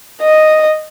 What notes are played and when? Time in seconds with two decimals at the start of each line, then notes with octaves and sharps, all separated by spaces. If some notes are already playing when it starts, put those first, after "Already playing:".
0.22 D#5